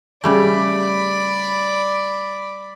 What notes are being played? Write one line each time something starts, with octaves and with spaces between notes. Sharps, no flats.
C#3 G3 A3 D5 B5